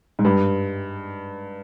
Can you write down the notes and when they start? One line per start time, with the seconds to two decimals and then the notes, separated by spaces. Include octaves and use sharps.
0.19 G#2
0.25 G2